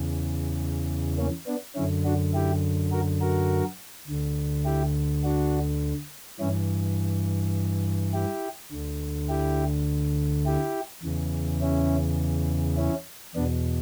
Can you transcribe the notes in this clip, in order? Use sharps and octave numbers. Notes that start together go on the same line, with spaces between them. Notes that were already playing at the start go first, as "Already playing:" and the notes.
Already playing: E2 C#3 E3
A#3 C#4
B3 D4
F#2 D3 C#4 E4
D4 F#4
E4 G4
F#4 A#4
F#4 A#4
D2 D3
E4 G4
D4 F#4
G2 E3 C#4 E4
E4 G4
D2 D3
E4 G4
E4 G4
E2 C#3 E3
C#4 E4
C#4 E4
E2 B2 B3 D4